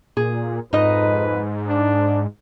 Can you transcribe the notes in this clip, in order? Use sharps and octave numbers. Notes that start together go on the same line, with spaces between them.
A#2 G#4
F2 G#2 D#4 B4 D#5
D4